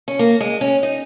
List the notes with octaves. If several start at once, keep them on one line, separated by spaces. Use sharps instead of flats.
C#4
A#3
G#3
C#4
D#4